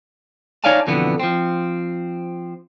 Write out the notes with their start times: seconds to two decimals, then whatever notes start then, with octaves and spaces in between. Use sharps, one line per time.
0.64 D#4 C#5 D5 F5 G#5 A5
0.87 F2 B2 D3 E3 B3
1.20 F3 C4